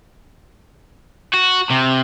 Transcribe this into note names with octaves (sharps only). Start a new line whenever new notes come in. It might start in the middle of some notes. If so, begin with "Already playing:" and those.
F#4
C3